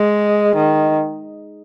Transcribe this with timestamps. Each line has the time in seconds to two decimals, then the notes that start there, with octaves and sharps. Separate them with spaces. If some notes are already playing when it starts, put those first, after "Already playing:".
Already playing: G#3
0.56 D#3